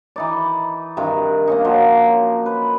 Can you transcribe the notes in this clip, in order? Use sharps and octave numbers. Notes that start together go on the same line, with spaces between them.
E3 D#4 D5
G2 C3 D#3
A#3 C#4 D#4
F3 F#3
B4